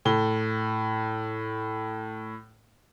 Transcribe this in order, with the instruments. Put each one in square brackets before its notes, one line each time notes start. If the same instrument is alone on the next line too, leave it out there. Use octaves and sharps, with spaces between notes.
[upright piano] A2 G7